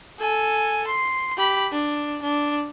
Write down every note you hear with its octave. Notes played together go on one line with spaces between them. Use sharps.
A4 G#5
C6
G4 B5
D4
D4